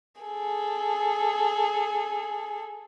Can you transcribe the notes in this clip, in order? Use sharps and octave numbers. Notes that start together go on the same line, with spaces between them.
G#4 A4